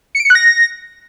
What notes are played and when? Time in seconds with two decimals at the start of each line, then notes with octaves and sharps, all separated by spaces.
0.15 C#7
0.20 D7
0.25 C#7
0.30 F#6
0.35 A#6